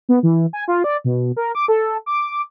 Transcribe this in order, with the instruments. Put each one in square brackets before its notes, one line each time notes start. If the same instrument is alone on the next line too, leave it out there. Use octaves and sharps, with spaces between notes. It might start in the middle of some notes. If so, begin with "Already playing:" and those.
[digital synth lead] B3
E3
G#5
F4
D5
B2
A#4
D6
A4
D6